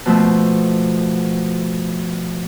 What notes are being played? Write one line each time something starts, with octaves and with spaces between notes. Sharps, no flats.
B2 F3 A3 E6